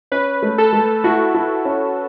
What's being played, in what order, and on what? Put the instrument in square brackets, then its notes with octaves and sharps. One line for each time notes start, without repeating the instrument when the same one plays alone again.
[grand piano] C#4 [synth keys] B4
[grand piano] A3
[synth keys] A4
[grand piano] A3
[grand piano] E4 [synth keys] F#4
[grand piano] E4
C#4